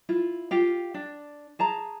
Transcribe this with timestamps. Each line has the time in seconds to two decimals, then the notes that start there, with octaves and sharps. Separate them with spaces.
0.09 E4 F4
0.51 F4 G4 F5
0.94 D4
1.59 G#4 A5 A#5